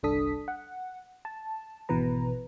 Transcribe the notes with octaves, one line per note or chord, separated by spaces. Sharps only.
G1 C2 D4 A4 D#6 B6
F#5
A5
G#1 B2 E3 B4 A#5